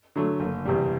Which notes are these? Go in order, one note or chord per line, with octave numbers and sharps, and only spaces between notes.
D3 F#3 A3
F#1
E2 C3 G3